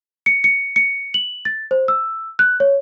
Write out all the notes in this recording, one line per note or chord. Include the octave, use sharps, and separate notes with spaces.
C#7
C#7
C#7
F#7
A6
C5
E6
F#6
C#5